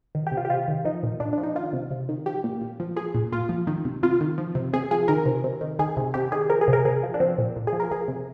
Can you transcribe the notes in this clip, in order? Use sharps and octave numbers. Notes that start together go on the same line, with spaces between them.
D#3
G4
C3
F4
G4
C3 F4
D#3
F3 D#4
A#2
A#2 D4
D4
F3
D#4
D#3 F4
C3
C3
D#3
F3 G4
A#2
A#2
F3
F3 G#4
A#2
A#2 F4
F3
D#3
C3
C3 F4
D#3
F3
C3
C3 G#4
F3 G#4
D#3 A#4
C3
C3
D#3
D#3 G#4
C3
C3 G4
D#3 G#4
F3 A#4
G#4
C3
A#4
C3 G#4
F3
D4
F3 C4
A#2
A#2
G#4
F3
A#4
F3 G#4
C3